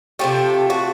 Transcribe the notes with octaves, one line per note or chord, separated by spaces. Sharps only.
C3 F3 A3 G4
F#4